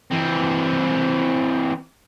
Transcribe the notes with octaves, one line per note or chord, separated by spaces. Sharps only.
E3 C4